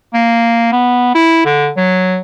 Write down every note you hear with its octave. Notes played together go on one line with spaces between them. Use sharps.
A#3
B3
E4
D3
F#3